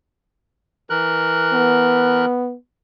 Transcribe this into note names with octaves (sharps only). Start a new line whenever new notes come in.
E3 A#4 F#6
B3